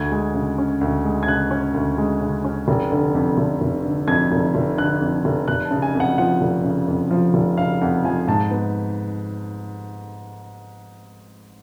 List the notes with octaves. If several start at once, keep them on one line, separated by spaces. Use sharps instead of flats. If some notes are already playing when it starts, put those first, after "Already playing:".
Already playing: D2 G#6
G#3
C#3
C#4
D2
G#3
G#6
C#3 F#6
C#4
D2
G#3
C#3
C#4
F1
D3
F2
F1
F1
D3
F2 G#6
F1
F1
D3 F#6
F2
F1
F1 F#6
A5
C#3
G#5
F2
F#5
F3 F#5
F1
C#3
F2
F3
F1
C#3 F5
F2 F#5
F3 G#5
G#2 A5
B3